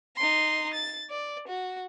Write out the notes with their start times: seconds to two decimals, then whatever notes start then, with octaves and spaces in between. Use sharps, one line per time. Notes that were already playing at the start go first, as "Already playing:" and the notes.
0.17 D#4 C6
0.73 A6
1.10 D5
1.48 F#4